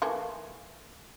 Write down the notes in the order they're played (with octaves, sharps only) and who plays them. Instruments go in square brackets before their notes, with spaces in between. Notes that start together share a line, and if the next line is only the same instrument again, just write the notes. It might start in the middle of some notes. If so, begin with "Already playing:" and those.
[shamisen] E3 A3 A#3